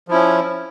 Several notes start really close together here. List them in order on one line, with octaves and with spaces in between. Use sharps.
F3 E4 C#4